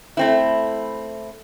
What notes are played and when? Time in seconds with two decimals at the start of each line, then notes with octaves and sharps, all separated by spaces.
0.17 A3 C4 E4